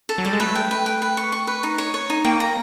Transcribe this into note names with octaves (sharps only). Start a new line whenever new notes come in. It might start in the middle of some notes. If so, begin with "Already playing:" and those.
A4
F#3
G3 A4
G#3
A3 B4
G5
B4
G5
B4
C#6
C#6
B4
D#4
C#5
C#5
D#4
A#3 G5
A#5